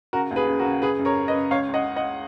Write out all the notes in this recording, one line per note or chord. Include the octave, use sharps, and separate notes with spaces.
C#3 F#4 A#4
D#2
G#4 B4
C#3
F#4 A#4
C#3
F#2 G#4 B4
F#2
A#4 C#5
C#3
B4 D#5
C#3
C#2 C#5 F5
C#2
D#5 F#5
C#3
D#5 F#5